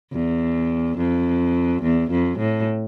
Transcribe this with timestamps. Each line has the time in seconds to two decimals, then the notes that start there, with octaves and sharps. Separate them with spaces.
0.13 E2
0.98 F2
1.83 E2
2.11 F2
2.39 A2